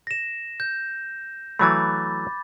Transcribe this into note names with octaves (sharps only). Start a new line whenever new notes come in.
A#6 E7
G6
E3 F#3 A3 B5 D6 A6